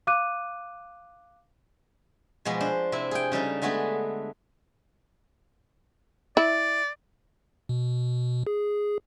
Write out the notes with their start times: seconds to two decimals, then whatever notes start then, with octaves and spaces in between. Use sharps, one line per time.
0.07 F5 D6 F#6 D#7
2.45 B2 F3 G#3 B3
2.60 D4 C5
2.92 C3 C4 E4
3.11 G#4 G5
3.32 C#3 G3 D#4 A4
3.62 D3 G#3 A3 B3 G#4 A4
6.37 E4 D5
7.69 B2
8.47 G#4